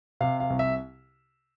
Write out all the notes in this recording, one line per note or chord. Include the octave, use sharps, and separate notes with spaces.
C3 F5
F5
C2
E5